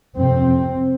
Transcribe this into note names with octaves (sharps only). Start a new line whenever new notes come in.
F2 C3 C4